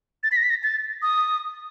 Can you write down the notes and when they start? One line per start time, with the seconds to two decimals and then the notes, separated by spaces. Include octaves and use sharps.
0.23 A6
0.32 B6
0.36 A#6
0.43 B6
0.50 A#6
0.63 A6
1.02 D#6